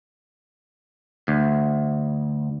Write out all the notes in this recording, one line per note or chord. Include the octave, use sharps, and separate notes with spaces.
D2